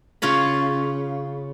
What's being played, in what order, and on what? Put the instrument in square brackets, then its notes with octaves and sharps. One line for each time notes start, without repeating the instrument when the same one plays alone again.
[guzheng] C#3 F4 C#5 B5